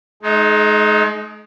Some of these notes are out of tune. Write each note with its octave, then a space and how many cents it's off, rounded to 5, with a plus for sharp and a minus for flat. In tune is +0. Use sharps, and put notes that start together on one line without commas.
G#3 +40 D#4 +0